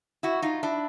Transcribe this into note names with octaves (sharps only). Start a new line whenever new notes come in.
E4 F#4
D#4 F4
D4 E4